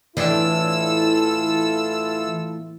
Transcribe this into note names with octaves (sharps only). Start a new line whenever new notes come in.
A2 E3 D4 E4 F4 A4 E6